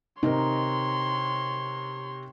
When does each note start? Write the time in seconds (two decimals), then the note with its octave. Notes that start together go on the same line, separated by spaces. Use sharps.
0.23 C3 C4 D#4 A#4 C#5 C6